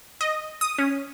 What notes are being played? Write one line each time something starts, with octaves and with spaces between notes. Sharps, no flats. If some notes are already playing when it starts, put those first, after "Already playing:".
D#5
D#6
C#4